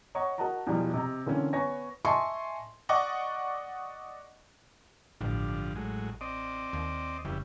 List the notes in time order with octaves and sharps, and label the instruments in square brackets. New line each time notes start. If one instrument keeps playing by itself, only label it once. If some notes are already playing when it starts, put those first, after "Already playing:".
[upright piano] C#5 D#5 F#5 A#5 C#6
F#4 A#4 D#5 F#5 A5 A#5
E2 B2 E3 F3 G3
C3 D#5 A#5
D3 E3 A#3 C4 C#4
B3 C#5 G#5 C#6 A#6
[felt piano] D#5 E5 G#5 A5 C6 C#6
[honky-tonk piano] D5 D#5 F#5 C#6 D6
[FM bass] A1 [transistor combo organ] G2 D3 F3
[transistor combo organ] A2 F#3 G#3
C4 D5 D#5
[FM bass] D#2
[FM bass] F1 [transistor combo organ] C#3 E3 G3